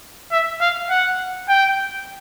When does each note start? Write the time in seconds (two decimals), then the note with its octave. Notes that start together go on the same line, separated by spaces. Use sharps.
0.32 E5
0.61 F5
0.90 F#5
1.49 G5